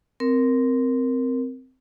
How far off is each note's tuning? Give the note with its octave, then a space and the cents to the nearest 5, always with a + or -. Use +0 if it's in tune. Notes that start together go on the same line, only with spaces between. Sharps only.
C4 -10 A#4 +0